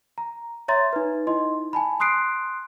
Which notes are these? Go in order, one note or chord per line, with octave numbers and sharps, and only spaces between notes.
A#5
C#5 E5 A#5 C6 A6
D#4 B4
D#4 E4 D#5 C6
G#5 A5 B5
C6 D#6 F#6 C7 D7